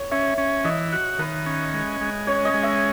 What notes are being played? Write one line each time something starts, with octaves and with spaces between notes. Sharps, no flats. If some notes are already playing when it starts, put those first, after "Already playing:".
Already playing: C#5
C#4 E5
C#4
E3 D#5
F#4
D#3 B4
C#4
G#3
G#3
C#4 C#5
D#5
G#3
E5